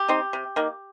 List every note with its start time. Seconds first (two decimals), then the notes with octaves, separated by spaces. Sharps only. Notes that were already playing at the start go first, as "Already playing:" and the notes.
Already playing: G4
0.08 C4 D#4
0.33 C3
0.56 D#3 A#3